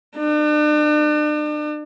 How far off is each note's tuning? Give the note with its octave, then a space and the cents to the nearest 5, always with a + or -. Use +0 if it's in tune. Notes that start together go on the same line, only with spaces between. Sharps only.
D4 +40